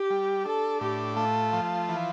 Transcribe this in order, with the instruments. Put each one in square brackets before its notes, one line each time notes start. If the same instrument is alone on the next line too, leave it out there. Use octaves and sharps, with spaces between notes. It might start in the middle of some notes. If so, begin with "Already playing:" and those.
Already playing: [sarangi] G4
[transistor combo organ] G3
[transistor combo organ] D4 [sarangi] A4
[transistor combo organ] A2 [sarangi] G4
[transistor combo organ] A3 [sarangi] F4
[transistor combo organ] F3
E3